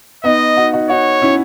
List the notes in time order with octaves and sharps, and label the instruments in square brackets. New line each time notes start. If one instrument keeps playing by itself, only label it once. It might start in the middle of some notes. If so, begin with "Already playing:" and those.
[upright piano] B3 D#4 [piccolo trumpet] D#5
[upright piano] D#4 F#4
D#4 F#4
[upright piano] D#4 F#4 [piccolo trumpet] C#5
[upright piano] C#4 E4